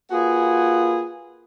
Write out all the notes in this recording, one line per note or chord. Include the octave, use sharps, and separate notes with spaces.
A#3 F4 F#4 G#4 B4 G#5